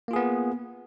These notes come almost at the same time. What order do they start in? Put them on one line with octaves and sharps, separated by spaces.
A#3 F4 G#4 B3